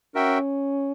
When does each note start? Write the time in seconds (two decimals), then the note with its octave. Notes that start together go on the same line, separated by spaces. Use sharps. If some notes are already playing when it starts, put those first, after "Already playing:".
0.15 C#4 F#4 A#4 E5 G5